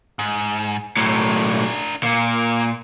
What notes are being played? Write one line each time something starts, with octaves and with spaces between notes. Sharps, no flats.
G#2
B1 A2 D4 A#4
A#2 A#3